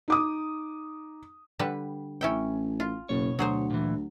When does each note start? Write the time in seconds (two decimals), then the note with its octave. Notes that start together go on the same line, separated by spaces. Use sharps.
0.08 D#4 D6 D#6
1.59 D3 G3 B4
2.21 A1 C#4 E4 G5
2.80 F4
3.09 F#1 B2 C#5
3.39 D2 F#3 G#4 C5
3.70 A#2 E3